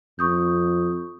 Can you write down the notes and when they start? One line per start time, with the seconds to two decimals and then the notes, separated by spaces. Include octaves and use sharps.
0.19 F2 C#6 D#6 G6